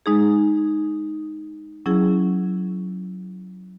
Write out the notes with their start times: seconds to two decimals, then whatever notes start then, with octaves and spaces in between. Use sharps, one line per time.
0.06 G#3 D#4 G#4
1.86 F#3 C#4 E4 G#4